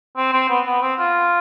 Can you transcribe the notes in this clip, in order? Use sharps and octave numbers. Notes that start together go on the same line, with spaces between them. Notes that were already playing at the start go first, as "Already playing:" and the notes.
C4
C4
B3
B3
C4
F4